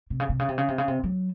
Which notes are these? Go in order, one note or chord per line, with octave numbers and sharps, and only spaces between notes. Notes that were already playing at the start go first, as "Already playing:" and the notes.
C3
C#3
C3
C#3
C3
C#3
C3
C#3
C3
F#3